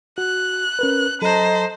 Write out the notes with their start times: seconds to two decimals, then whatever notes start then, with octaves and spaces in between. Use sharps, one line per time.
0.18 F#4 F#6
0.79 C#4 A#4 B4
1.22 F#3 A4 C5 D#5 A5 A#5